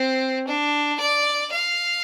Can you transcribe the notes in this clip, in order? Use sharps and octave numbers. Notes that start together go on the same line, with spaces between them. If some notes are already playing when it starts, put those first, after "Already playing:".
Already playing: C4
D4
D5
F5